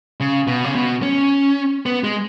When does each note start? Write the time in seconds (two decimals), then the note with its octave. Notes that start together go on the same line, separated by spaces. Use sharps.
0.20 C#3
0.47 B2
0.64 C#3
0.75 B2
1.03 C#4
1.86 B3
2.04 G#3